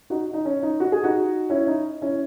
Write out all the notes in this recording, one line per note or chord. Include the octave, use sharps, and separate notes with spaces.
D#4 F#4
D#4
C#4
D#4
F#4
G#4
D#4 F#4
C#4 E4
D#4
C#4 E4